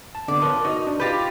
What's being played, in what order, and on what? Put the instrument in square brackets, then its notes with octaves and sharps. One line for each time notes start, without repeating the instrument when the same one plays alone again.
[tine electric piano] A5
[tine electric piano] D3 B3 [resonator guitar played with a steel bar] D5
[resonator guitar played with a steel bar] F3 [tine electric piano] A#4 B4 C#5
[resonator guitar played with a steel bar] D#4 [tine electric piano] F#4 D#5 C#6
[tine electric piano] D4
[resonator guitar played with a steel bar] F4 G4 B4 [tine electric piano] G6 A6 A#6